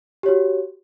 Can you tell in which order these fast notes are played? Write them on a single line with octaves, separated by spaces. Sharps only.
G4 C#5 F#4